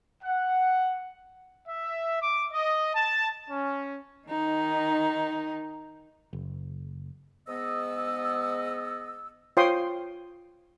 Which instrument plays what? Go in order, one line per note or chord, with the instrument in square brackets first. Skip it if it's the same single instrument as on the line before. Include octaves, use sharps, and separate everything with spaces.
[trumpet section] F#5
E5
D6
D#5
A5
C#4
[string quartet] D#3 D#4
[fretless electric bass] F#1
[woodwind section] G#2 B3 D#5 E6
[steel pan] F4 C5 C#5 G5 C6 D#6